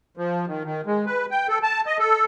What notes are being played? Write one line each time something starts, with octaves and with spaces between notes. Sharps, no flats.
F3
D#3
D#3
G#3
B4
G5
A4
A5
D#5
A4